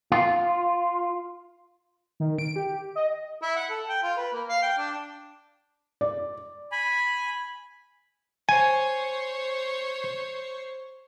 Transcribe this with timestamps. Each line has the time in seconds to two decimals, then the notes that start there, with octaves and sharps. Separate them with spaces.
0.12 F4
2.20 D#3
2.39 D7
2.56 G4
2.95 D#5
3.43 E4
3.56 F#5
3.70 A4
3.89 G5
4.03 F4
4.17 B4
4.33 A#3
4.49 F5
4.63 G5
4.78 D4
6.01 D5
6.72 G#5 B5
8.49 C5 C#5 G#5